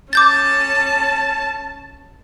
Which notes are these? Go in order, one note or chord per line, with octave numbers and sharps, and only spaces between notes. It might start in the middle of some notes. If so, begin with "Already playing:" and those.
C#4 A5 D6 G6 A6